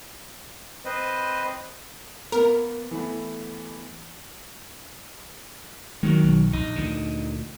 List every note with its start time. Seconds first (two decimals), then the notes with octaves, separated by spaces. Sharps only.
0.85 C4 B4 C5 D#5
2.32 A#3 B3 A#4
2.91 E3 A3 B3
6.03 D#3 F#3 G#3 A#3
6.23 B1
6.53 A#1 D#4
6.76 D2 A#2 D3